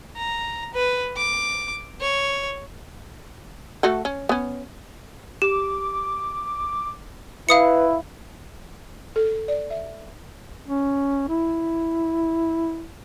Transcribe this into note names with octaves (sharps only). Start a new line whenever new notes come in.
A#5
B4
D6
C#5
A3 F#4 A4
C#4
B3 C#4
G4 D6
E4 B4 F5 D#6 C#7
A4
D5
E5
C#4
E4